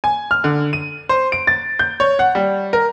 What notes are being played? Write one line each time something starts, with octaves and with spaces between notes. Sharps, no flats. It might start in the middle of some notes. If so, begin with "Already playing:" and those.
G#5
F6
D3
D#7
C5
D7
A6
G6
C#5
F#5
G3
A#4